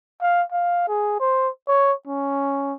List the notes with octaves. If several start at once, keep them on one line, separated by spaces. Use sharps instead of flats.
F5
F5
G#4
C5
C#5
C#4